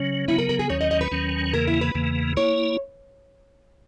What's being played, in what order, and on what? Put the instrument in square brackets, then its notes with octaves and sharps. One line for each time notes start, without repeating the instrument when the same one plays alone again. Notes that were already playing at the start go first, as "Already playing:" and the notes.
Already playing: [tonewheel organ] C#3 F#3 [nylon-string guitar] C#4
[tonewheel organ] C#3 F#3 B3 [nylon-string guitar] E4
[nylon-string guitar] A#4
A#4
G#4
[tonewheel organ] D#2 D#3 F#3 C#4 [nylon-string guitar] C#5
[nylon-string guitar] D#5
D#5
B4
[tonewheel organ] D#2 D#3 F#3 C#4
[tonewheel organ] E2 C#3 E3 A#3 [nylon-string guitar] A#4
[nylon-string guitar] E4
B4
[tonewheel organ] E2 C#3 E3 A#3
[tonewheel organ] A#3 E4 [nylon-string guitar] C#5